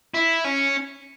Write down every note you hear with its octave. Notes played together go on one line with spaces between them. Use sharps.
E4
C#4